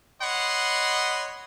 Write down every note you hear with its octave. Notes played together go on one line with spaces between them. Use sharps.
C#5 D#5 F#5 B5 C6